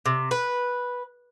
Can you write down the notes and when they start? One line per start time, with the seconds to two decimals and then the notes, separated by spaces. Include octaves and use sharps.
0.06 C3
0.31 B4